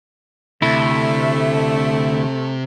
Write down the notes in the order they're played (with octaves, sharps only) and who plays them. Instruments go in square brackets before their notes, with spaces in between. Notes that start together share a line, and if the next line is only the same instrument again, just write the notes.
[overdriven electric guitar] D2 [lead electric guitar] C3 [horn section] A3 [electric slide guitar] E4